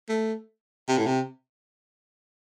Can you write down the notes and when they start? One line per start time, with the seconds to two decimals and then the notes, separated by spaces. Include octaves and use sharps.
0.09 A3
0.88 C3
0.98 A2
1.06 C3